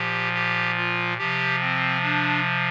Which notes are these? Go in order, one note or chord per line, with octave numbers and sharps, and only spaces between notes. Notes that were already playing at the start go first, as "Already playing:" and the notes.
Already playing: A#2 F3 G4
G4
F4
C3 F3 G4
C4
D4